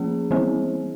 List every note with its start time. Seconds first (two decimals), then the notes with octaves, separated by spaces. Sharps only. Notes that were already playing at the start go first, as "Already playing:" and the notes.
Already playing: F3 A#3 C#4 G#4
0.31 E3 G3 C4